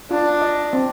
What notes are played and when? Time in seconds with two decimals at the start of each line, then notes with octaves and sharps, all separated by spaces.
0.11 D4 F4
0.42 D#5
0.73 C4